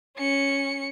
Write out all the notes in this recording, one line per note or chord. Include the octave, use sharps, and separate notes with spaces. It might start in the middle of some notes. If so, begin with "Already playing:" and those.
C#4 C#7